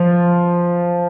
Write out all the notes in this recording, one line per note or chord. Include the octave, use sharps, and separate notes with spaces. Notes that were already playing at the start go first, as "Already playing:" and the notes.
Already playing: F3 F4